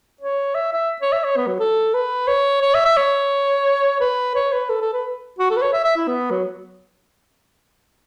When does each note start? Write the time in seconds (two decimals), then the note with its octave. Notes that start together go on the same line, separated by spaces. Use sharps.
0.21 C#5
0.55 E5
0.73 E5
1.02 C#5
1.13 E5
1.24 C#5
1.37 B3
1.47 F#3
1.60 A4
1.94 B4
2.28 C#5
2.62 C#5
2.75 E5
2.86 E5
2.97 C#5
4.01 B4
4.35 C#5
4.53 B4
4.70 A4
4.82 A4
4.93 B4
5.39 F#4
5.50 A4
5.57 B4
5.62 C#5
5.73 E5
5.85 E5
5.97 E4
6.08 B3
6.31 F#3